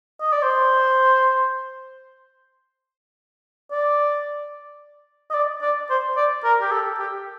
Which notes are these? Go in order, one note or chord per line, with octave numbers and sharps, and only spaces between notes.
D#5
D5
C5
D5
D#5
D5
D5
C5
D5
A#4
G4
A4
G4